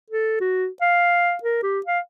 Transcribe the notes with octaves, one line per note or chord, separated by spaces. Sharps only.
A4
F#4
F5
A#4
G4
F5